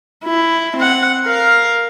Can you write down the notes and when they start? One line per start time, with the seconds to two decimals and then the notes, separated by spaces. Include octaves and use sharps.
0.25 E4
0.77 C4 F#5
1.26 A#4 F5